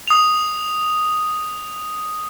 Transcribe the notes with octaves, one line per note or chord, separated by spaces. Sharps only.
D#6 F7